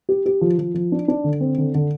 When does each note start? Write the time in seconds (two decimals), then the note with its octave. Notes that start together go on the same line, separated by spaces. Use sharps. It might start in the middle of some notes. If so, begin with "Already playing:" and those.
0.09 G4
0.26 G4
0.41 F3
0.58 F3
0.74 F3
0.92 D4
1.08 D4
1.24 D3
1.40 C4
1.58 D3
1.75 D3